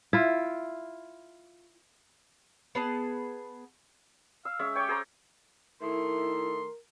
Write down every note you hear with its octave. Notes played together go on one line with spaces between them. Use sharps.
E4 F4
B3 G#4 A5
F5 E6
G#3 C#4 E5
G4 C#5 G5 C#6
G#4 C5 A#5
D#3 A3 E4 A#4 C6